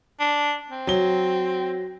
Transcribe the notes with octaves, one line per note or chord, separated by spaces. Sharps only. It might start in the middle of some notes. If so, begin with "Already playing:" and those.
D4
C4
F#3 G7